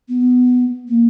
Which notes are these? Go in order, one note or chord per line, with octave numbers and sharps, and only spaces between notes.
B3
A#3